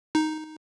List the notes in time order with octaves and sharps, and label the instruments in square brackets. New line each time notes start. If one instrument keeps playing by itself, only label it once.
[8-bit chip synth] D#4